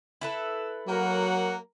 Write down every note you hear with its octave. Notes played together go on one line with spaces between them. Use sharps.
E4 A4 B4 E6
F#3 A#3 F#4 A#4 F#5